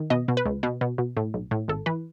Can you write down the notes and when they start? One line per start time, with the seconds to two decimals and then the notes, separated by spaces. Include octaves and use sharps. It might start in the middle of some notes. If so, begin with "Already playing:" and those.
Already playing: D#3
0.10 B2 D#5
0.28 B2
0.37 B4
0.46 C#2
0.63 B2
0.81 B2
0.98 B2
1.17 A2
1.34 B1
1.51 A2
1.68 G#1 A4
1.86 E3 B4